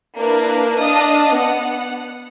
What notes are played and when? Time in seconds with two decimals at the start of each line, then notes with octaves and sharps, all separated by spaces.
0.17 A#3 D4 E4 A#4 B4
0.78 D4 D#5 F5 A5 D#6
1.32 B3 F#5